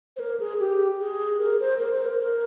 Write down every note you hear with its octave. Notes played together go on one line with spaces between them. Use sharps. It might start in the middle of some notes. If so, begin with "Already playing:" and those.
C5
A#4
G#4
G4
G#4
A#4
C5
A#4
C5
A#4
A#4